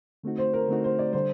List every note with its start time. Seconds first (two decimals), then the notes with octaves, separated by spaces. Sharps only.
0.24 D3 A3 C4 D#4 F#4
0.38 C5
0.54 A#4
0.68 D3 A3 C4 D#4 F#4
0.84 C5
0.99 D5
1.13 D3 G3 C5